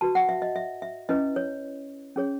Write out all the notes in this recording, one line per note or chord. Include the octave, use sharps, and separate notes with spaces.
F#4 B4 A5
F#5
E5
D#5
E5
E5
C#4 E4 B4 D#5
C#5
C#4 G#4 C#5